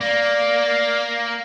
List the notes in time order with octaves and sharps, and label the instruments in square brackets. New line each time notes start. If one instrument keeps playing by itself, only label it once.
[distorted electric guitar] A#3 [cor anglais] D5